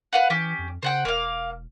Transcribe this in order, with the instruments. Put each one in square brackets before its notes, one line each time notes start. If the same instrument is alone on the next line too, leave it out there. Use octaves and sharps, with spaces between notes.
[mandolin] B4 F5 F#5
[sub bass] E3 [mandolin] C#4 G4
[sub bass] F2
[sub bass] C#3 [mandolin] C5 F#5 G5
[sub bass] E1 [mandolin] A#3 F5